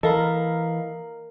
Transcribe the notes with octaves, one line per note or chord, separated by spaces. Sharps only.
E3 A4 A#4 D#5 F5 B5